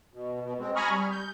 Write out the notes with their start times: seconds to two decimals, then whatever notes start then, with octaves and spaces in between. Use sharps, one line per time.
0.13 B2
0.43 B2
0.60 G#3 C4
0.76 G#5 A#5 B5 C#6 D#6 F6
0.90 G3
1.12 G6